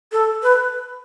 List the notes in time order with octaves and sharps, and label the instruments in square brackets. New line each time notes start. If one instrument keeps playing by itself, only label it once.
[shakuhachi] A4
B4